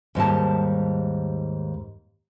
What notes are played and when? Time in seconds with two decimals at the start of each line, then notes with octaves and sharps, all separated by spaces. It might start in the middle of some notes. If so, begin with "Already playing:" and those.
0.15 D#2 G#2 G3 A5